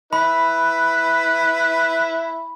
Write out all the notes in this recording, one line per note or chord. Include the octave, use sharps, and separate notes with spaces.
E4 B4 B5